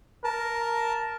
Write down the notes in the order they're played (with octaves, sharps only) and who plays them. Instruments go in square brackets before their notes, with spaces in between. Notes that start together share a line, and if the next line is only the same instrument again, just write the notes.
[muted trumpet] A#4 [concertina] A5